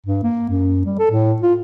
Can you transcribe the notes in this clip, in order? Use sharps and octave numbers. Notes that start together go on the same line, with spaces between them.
G2
A#3
F#2
G3
A4
A2
F4